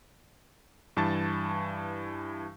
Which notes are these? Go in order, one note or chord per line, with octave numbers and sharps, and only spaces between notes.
G2 E3 A5 C#6 A6